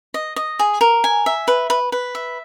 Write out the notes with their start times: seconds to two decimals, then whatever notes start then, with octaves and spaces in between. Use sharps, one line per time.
0.14 D#5
0.36 D#5
0.59 G#4
0.81 A#4
1.04 G#5
1.26 E5
1.48 B4
1.70 B4
1.92 B4
2.15 E5